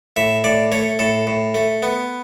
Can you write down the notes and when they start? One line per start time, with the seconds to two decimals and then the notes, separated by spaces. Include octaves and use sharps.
0.16 A2 E5
0.44 A2 D5
0.72 A3 C#5
0.99 A2 A4
1.27 A2
1.55 A3
1.83 B3